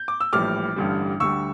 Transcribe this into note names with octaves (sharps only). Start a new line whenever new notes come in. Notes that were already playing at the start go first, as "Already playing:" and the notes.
Already playing: G6
D6
E6
A#1 A2 E3 G3 D6 F6
A1 G2 D3 G3
D2 D3 G3 C#6 E6